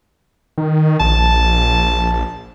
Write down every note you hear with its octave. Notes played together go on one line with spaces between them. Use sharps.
D#3
A#1 A5